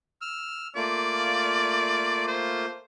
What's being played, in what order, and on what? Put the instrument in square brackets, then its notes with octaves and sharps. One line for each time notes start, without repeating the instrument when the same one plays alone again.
[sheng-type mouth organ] E6 F6
[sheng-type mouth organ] A3 A#3 F4 [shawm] D5
[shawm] C5